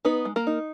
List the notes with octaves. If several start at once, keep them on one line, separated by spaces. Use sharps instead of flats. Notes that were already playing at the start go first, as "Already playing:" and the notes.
B3 D#4 B4
G#3
A#3 A#4
D#4